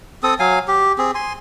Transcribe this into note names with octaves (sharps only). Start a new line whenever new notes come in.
C4 A4 D#6
F#3 F5 G#5
G4
C4 G#4
G#5 C6